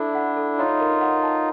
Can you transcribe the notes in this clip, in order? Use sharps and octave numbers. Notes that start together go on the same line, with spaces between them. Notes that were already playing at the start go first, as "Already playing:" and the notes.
Already playing: D4 E4 A4 D5
F#5
A4
D#4 F4 C#5
A#4
F#5
A5